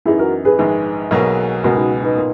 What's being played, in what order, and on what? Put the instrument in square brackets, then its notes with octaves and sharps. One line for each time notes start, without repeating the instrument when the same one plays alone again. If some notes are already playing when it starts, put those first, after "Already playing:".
[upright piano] F#2 E3 B3 D#4 [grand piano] E4 G#4
[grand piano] F#4 A#4
G#4 B4
[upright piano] A#1 G#2 D#3 G#3
B1 B2 F#3 A#3
[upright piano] C#2 B2 G#3 [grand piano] F#4 A#4
[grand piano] D#4 F#4
B3
B3 D#4
[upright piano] A#2 A#3